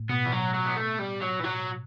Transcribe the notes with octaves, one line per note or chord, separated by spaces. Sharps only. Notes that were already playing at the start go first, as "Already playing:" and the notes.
Already playing: A2
B2 B3
E3
F#3
F#3
B3
A3
G3
F#3
E3
F#3